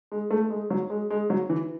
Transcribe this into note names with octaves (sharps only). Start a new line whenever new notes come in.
G#3
A3
G#3
F#3
G#3
G#3
F#3
E3